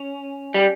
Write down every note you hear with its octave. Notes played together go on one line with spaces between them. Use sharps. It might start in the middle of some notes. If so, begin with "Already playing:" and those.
Already playing: C#4
G3